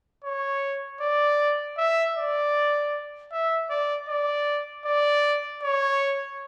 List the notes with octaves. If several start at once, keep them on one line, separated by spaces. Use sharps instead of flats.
C#5
D5
E5
D5
E5
D5
D5
D5
C#5